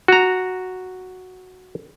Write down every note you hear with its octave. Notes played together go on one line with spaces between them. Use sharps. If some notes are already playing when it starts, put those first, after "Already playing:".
F#4 A#5